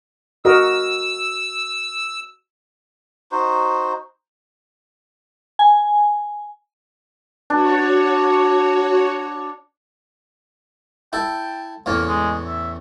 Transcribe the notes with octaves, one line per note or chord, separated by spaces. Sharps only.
F#4 A#4 D#5 E6
D#4 F#4 C5
G#5
D4 F#4 C#5
E4 A4 G5
E2 A2 A#3 C#4
G#3
E5